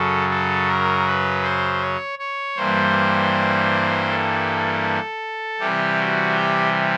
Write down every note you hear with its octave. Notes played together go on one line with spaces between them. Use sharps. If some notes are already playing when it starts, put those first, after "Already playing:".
Already playing: F#2 C#3 F#3 A4
A4
A#4
B4
C5
C#5
C#5
G2 E3 G3 A#3 C5
A4
C3 E3 G3 G4
F#4
G4